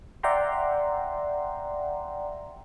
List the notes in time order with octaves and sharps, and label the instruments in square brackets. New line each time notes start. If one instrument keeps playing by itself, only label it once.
[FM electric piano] D5 E5 F#5 G5 A#5 C6